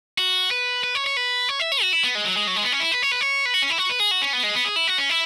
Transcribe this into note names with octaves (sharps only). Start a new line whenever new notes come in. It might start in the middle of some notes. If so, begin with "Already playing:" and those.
F#4
B4
B4
C#5
C#5
B4
C#5
E5
C#5
F#4
E4
B3
G#3
F#3
G#3
F#3
G#3
B3
C#4
E4
B4
C#5
B4
C#5
B4
F#4
C#4
E4
F#4
B4
G#4
F#4
C#4
B3
G#3
B3
G#4
E4
F#4
C#4
E4